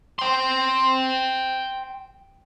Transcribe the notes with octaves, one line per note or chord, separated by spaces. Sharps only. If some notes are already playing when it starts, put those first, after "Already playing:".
G5 C6